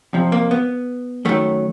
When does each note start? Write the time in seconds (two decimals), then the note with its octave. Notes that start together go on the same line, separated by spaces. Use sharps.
0.13 F2 C3 F3
0.32 A#3
0.51 B3
1.25 F#2 D#3 F#3 A3